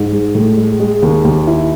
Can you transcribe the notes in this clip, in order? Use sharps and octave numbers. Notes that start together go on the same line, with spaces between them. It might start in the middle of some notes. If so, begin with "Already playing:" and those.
Already playing: G#2
G#3
A2
G#3
G#3
D#2
D#2
E4